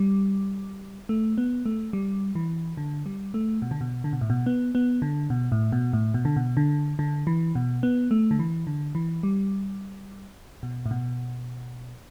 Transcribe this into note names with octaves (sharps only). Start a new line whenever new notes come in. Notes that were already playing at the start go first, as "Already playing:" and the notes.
Already playing: G3
A3
B3
A3
G3
E3
D3
G3
A3
B2
D3
B2
D3
B2
A2
B2
B3
B3
D3
B2
A2
B2
A2
B2
D3
B2
D3
D3
E3
B2
B3
A3
D3
E3
D3
E3
G3
B2
A2
B2